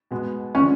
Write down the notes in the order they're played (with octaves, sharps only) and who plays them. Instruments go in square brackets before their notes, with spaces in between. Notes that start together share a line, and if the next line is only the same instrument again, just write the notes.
[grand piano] B2 G#3 B3
[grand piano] F3 G#3 B3 D4 [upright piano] C#4